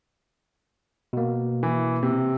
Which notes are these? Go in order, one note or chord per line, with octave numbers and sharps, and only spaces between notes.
B2 A#3
E3
C3